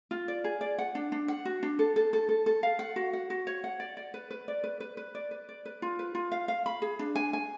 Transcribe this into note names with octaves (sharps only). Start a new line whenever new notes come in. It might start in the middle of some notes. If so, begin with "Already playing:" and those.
F4
D5
G#4
D5
F#5
D4
D4
F#5
F#4
D4
A4
A4
A4
A4
A4
F5
F#5
F#4
F#5
F#4
C#5
F#5
D5
D5
B4
B4
D5
B4
B4
B4
D5
B4
D5
B4
F4
B4
F4
F5
F5
B5
G#4
D4
G#5
G#5